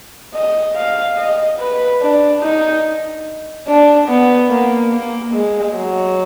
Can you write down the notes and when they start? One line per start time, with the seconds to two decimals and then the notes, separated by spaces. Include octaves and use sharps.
0.34 D#5
0.76 F5
1.17 D#5
1.59 B4
2.01 D4
2.43 D#4
3.67 D4
4.08 B3
4.50 A#3
4.92 A#3
5.34 G#3
5.75 F#3